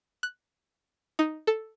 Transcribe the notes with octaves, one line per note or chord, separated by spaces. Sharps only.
F#6
D#4
A4